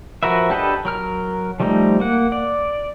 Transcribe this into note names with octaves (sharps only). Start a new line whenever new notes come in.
F3 F#4 A#4 B4 E5
D4 G4 A4 B4 D#5
F#3 A#4 F6
F3 G3 A3 D#4
A#3 F#5
D5